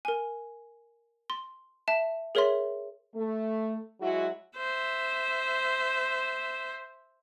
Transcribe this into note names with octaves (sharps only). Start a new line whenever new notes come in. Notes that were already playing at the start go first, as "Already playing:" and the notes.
A#4 G#5
C6
E5 A5 E7
G#4 A#4 C#5 E5 C6
A3
F#3 G#3 E4 F#4
C5 E5